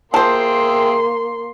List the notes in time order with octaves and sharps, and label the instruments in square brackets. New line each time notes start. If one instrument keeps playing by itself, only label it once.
[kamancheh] A#3 C6 [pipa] F4 C5 [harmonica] G#4 E5 G5 [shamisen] A5